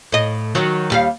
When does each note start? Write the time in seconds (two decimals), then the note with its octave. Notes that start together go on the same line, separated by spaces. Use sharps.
0.12 A2 D#5
0.55 D#3 F#3 F#4
0.90 D#2 G3 F5